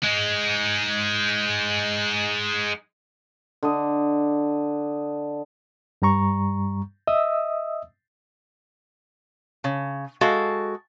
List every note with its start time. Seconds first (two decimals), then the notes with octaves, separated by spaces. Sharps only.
0.03 G#3 D#4
3.63 D3 D#5
6.02 G2 G3 A#5 C#6
7.07 D#5 E5 D#6 E6
9.64 C#3
10.21 G#3 F#4 A4 F5